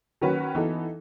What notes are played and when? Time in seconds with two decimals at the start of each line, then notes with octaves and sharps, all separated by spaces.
0.21 D#3 F#3 C#4 F#4 B4
0.55 E3 B3 D#4 A4